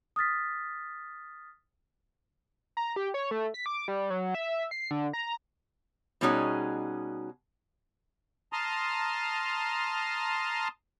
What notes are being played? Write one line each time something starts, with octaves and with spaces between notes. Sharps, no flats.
D#6 F6 A6 B6
A#5
G4
C#5
A3
B6
D6
G3
F#3
E5
C7
D3
A#5
B2 G3 C#4 D#4 F#4 G#4
A5 A#5 C6 D#6 F6